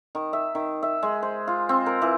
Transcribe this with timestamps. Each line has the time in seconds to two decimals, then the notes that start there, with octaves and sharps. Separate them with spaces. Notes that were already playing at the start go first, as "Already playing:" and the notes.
0.15 D#3
0.33 E5
0.55 D#3
0.82 E5
1.03 G#3
1.23 C5
1.47 F4
1.69 C4
1.86 A#4
2.02 E3